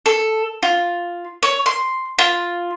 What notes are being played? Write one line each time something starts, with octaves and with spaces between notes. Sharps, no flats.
A4
F4
C#5
C6
F4